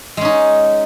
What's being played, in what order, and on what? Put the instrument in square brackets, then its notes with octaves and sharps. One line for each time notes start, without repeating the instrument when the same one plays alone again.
[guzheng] G#3
C#4
D#4